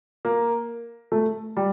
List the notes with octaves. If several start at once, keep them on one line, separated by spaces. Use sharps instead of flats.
A#3
A3
G3